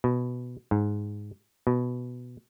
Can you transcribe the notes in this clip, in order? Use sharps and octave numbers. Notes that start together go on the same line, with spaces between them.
B2
G#2
B2